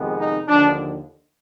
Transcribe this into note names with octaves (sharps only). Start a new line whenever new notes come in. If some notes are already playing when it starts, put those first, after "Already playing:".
Already playing: F2 C3 D#3 G#3 B3
D#4
D#2 D3 F3 D4